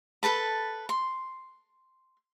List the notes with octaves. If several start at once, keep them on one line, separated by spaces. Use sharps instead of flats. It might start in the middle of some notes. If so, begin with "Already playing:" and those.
A4 B4 A5 B5
C6